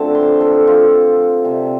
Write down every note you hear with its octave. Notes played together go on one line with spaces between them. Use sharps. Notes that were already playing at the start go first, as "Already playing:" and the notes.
Already playing: D3 F3 A3 C4 A5
C6
A4
F4
C3 G3 C4